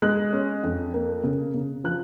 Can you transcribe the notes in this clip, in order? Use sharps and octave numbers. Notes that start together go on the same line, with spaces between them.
G#3 F#6
C#4
F2
A#3
C#3
C#3
F3 F#6